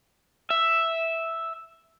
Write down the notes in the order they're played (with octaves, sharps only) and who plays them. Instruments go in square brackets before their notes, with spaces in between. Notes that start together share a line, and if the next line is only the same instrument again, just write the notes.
[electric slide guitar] E5